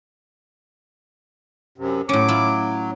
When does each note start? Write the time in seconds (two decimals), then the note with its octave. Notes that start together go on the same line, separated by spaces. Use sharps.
1.78 F#2 C3
2.09 A2 F#3 C#4 D6
2.28 E4 F4